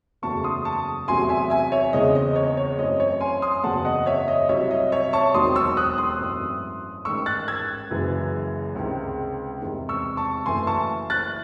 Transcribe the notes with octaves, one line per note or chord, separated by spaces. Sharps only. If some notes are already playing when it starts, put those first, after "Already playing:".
F#1 E2 C#3 F#3 A3 A5 C#6
C6 D#6
A5 C#6
E2 C3 F#3 A3 G#5 C6
E5 G#5
E5 G#5
C#5 E5
E2 C#3 G#3 C4 D#5
D#5
C#5
C#5
F#2 E3 A3 C4 D#5
C#5
G#5 C6
C6 D#6
F#1 E2 C#3 F#3 C4 F#5 A5
D#5 F#5
C#5 E5
D#5
C2 C3 F#3 C#5 E5
D#5
C#5 E5
A5 C#6
E1 D#2 D#3 F#3 C4 C6 D#6
C#6 E6
D#6 F#6
C6 D#6
G#1 F#2 E3 A3
A1 G#2 D#3 C#6 E6
F#6 A6
E6 G#6
F#1 F#2 C#3 E3 G#3
C#2 C3 D#3 G#3 C4
E1 E2 C3 D#3
C#6 E6
A5 C#6
F#1 F#2 E3 A3 G#5 C6
A5 C#6
F#6 A6